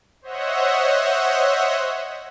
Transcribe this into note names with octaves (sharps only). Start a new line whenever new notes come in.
C5 C#5 D#5 E5 F#5